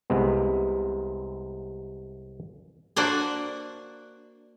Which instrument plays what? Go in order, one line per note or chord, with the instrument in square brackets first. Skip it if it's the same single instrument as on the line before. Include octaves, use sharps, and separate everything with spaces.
[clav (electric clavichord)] C2 C3 G#3 B3
[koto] A#3 D4 F#4 C5 F#5 G#5